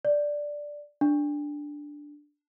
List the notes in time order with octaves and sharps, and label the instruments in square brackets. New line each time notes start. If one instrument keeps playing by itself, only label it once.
[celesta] D5
D4